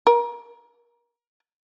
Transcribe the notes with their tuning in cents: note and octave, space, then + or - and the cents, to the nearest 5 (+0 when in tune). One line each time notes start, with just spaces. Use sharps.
A#4 +30